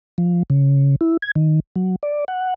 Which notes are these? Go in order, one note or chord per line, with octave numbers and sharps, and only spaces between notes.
F3
C#3
E4
G#6
D#3
F#3
D5
F#5